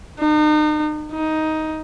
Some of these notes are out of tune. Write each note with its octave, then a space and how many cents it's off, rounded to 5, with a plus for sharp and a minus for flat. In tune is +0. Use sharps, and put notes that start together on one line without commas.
D#4 -40
D#4 +10